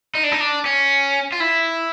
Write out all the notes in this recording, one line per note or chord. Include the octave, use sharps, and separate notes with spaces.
D#4
D4
D#4
D4
C#4
F4
E4